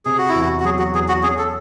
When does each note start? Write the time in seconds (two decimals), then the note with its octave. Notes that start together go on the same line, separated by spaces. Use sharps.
0.05 C3 G#4
0.18 F#4
0.29 E4
0.35 E2
0.42 F#4
0.60 F#4
0.64 F#3 G#4
0.79 F#4
0.94 E2 G#4
1.08 F#4
1.23 C#4 G#4
1.38 A4